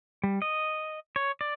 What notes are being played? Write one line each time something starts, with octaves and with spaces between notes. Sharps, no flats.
G3
D#5
C#5
D5